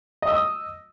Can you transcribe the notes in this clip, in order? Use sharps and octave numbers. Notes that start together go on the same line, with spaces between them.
D#5 D#6 E6